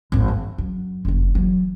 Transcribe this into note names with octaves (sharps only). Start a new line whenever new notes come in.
G#1 F2
G2
F#2
F#1 F2
E3 F#3